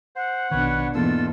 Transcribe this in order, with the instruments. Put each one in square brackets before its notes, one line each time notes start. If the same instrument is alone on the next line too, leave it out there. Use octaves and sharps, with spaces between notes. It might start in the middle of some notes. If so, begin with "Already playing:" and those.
[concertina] C5 [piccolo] F#5
[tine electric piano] A#1 D#3 [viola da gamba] B2 D4 [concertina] B4 C#5
[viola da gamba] E2 G#2 [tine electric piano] A#3 B3 [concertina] F4 A4 E6